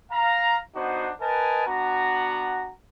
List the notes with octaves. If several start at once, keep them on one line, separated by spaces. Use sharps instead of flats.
F5 A#5
B3 D4 D#4 F#4 C5
A#4 B4 D#5 G#5 A5
B3 D4 F#4 F#5 A#5